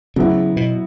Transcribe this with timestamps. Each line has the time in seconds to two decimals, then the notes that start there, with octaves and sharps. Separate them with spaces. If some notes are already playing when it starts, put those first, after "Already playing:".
0.16 C#3 F#3 B3 E4
0.57 B2